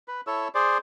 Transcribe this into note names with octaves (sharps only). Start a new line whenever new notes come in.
B4
E4 A4 C#5 E6
G#4 C5 D5